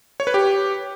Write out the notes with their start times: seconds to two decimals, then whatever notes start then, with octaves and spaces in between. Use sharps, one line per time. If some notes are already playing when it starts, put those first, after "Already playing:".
0.20 C#5
0.27 B4
0.34 G4